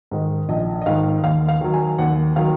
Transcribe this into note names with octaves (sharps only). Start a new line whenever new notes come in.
G#2 D#3 D#5
A#1 D#5
D#5
G#2 D#3 F5
D#2 F5
F5
D#3 F#3
G#5
D#2 F#5
D#3 F#3 F5